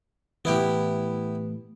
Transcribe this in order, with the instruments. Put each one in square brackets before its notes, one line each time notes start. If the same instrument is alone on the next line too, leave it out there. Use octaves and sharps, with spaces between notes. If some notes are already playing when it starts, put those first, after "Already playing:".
[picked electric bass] A2 E3 [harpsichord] B3 E4 G4